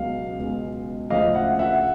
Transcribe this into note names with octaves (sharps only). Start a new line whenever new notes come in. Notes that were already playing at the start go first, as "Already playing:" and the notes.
Already playing: C#2 B2 F#3 F5
C#2 B2 G#3
D2 C#3 F3 D#5 F5
E5 F#5
E5 F#5